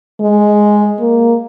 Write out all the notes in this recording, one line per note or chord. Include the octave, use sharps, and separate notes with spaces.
G#3
A#3